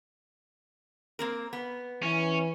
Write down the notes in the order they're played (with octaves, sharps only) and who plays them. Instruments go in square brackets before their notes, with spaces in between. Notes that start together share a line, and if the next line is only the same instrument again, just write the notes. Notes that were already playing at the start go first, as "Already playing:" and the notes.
[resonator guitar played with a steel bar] A#3 C4 A#4
B3
[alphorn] E3 [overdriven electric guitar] C#4